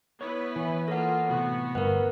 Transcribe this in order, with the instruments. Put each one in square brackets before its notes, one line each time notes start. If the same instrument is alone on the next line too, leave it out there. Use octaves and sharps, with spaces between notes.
[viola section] B3 E4 B4 [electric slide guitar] C#5
[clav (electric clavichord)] E3
[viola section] A#3 F4 [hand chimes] A4 F#5
[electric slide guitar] A2 C3 [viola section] B3 F#4
[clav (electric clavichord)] G1 [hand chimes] A#4 B4 [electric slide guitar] F#5